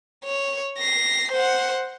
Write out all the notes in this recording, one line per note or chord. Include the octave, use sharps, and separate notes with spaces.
C#5
A#6 C7
C5 F#5